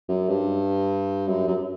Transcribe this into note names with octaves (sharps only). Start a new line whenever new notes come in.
F#2
G2
F#2
F#2